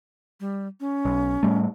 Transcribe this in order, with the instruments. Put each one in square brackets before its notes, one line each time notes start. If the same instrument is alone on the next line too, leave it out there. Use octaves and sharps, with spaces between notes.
[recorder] G3
C#4
[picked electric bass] B1
A2 G3 A3